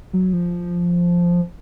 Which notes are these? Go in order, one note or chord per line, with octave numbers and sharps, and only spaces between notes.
F#3
F3